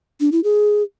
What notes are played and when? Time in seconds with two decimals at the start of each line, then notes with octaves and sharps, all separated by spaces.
0.20 D4
0.32 E4
0.44 G#4